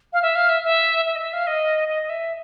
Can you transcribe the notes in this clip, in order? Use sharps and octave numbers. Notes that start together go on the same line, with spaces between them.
F5
E5
F5
E5
E5
E5
D#5
E5
F5
D#5
D#5
D#5
E5